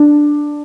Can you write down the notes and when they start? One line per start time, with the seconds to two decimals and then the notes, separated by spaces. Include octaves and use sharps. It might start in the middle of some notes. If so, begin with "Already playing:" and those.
Already playing: D4